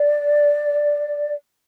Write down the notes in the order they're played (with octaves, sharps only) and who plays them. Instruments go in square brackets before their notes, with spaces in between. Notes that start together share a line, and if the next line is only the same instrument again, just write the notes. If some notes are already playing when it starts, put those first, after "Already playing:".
Already playing: [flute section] D5